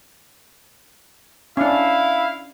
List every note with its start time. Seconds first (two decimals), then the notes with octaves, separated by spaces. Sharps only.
1.57 C#4 D4 E4 F5